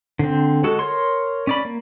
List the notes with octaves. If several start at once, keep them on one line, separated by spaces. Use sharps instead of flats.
D3 C4
G#3 F#4 A4 A5
A#4 C#5 C6
C#4 D5 B5
A#3